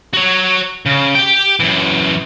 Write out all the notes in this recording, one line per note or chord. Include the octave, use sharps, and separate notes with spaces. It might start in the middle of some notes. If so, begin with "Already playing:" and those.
F#4 C#5
C#3
G4 G5
F#2 E3